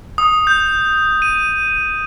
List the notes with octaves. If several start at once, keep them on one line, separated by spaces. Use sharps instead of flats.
D#6
G6
D#7